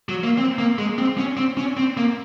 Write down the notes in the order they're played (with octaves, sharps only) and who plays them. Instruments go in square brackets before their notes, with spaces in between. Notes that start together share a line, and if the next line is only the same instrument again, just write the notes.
[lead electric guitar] F#3
A#3
C4
A#3
G#3
C4
C#4
C4
C#4
C4
A#3